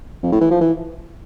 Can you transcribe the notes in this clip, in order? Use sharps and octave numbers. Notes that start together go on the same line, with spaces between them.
F2
A2
E3
F3
E3